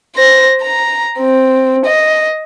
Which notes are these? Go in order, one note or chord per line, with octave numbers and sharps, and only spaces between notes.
C5 A#6
A#5
C4
D#5